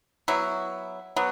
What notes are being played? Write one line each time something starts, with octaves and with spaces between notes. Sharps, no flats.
F#3 B3 E4
F#3 B3